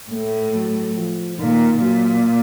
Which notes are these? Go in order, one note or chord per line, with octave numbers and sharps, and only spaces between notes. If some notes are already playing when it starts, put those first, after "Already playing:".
A2 A3
F#3
F3
A#2 D#3
A#2 F#3